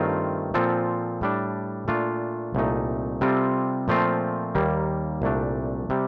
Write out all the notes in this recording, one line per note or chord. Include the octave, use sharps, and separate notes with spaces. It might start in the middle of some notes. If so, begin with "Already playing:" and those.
Already playing: G2 D#3 A3 C4 F4
A#2 F3 C4 F4 A4
A2 G3 D4
A#2 A3 D4 F4
C2 A#2 A3 D#4
C3 G3 C4 F4 A4
A#2 F3 A3 C4 F4
D#2 D#3 G3 A#3
C2 A#2 A3 D4
C3 G3